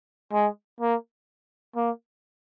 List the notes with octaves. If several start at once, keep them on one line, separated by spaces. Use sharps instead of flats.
G#3
A#3
A#3